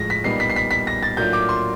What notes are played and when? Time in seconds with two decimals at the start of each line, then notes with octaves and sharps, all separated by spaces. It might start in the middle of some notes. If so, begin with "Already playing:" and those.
Already playing: A2 F3 G#3 A#6
0.10 B6
0.24 A#2 G3 B3 D#4 C7
0.40 B6
0.50 C7
0.56 B6
0.71 B6
0.87 A#6
1.03 A6
1.17 A2 F#3 A#3 D4 F4 G6
1.33 D6
1.49 C6